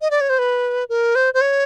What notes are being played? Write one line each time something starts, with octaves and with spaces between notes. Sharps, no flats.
D#5
D5
C#5
C5
B4
A#4
C5
C5
C#5